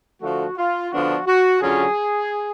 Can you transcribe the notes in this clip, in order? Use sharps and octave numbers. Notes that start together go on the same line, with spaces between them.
D3 F3 A3 F#4
F4
D3 F3 B3 D4 F4 F#4
F#4
D3 F#3 C#4 F4 G#4